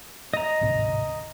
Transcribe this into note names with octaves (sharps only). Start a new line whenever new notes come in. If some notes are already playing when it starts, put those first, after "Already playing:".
D#5 A#5
D1 G#1 C3